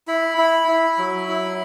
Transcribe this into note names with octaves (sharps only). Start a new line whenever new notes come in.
E4 B5
E4
E4
F#3
E4